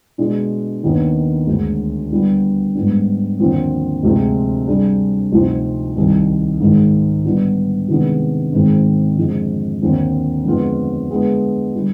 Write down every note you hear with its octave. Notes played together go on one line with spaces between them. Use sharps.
B2 G#3 D4
D#2 D#3 B3 D4
D2 D3 G#3
D3 G3 B3
G#2 G3 B3 D4
D#2 D3 F3 C4
D2 C3 F3 G#3 D4
C3 G3 D4 G#4
D2 C3 F3 C4 D#4
C2 C3 D#3
G#2 D#3 G#3
D3 G3 B3 D4
C3 D#3 G#3 B3 D4
G#2 D#3 G#3 C4
F2 D3 F3 G#3
D#2 D3 F3 C4
F2 D3 G#3 B3 F4
D3 G#3 B3
D3 G3